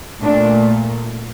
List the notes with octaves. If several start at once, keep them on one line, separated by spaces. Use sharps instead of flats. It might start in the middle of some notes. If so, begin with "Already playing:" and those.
A#2 A3 D4